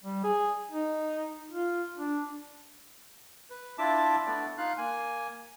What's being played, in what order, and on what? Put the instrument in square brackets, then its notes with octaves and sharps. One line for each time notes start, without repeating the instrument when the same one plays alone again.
[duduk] G3
G#4
D#4
F4
D4
[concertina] B4
D4 E4 F4 E5 A5 D6
A3 B3 D4 D5
D#4 F4 F5 F#6
A#3 G#5